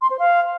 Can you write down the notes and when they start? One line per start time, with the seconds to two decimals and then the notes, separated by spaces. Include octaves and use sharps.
0.02 C6
0.10 C5
0.19 F5